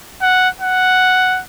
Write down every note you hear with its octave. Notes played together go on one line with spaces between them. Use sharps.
F#5
F#5